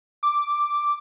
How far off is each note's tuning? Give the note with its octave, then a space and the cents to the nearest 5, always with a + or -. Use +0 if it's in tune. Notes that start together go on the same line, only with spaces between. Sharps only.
D6 +0